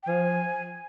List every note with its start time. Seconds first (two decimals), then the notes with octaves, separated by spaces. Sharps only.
0.03 G5
0.08 F3 G#5